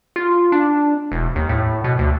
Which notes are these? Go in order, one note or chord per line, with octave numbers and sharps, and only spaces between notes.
F4
D4
E1
D#2
A2
B2
D2